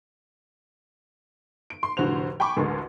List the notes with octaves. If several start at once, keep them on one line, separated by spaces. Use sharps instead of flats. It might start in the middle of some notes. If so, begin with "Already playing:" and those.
D7
C6
F1 A2 D3 F#4 C5 F7
G5 G#5 B5 C#6 D6
A1 D2 G#3 D4 A#4 C6